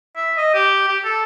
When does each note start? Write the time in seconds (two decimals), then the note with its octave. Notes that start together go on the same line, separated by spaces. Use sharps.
0.16 E5
0.37 D#5
0.54 G4
0.88 G4
1.04 A4